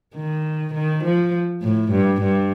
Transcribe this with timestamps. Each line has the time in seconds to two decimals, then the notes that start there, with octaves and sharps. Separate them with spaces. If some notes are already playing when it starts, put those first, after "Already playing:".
0.15 D#3
0.74 D#3
1.04 F3
1.61 A2
1.92 G2
2.21 G2